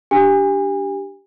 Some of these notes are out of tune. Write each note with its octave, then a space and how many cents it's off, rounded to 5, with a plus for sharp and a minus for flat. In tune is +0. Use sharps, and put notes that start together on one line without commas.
D4 +0 G4 +0 G#5 -35